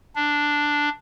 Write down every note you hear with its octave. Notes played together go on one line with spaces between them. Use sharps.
D4